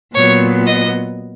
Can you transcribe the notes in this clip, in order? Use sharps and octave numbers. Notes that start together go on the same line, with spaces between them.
A#2 F#3 B3 C#5
D#5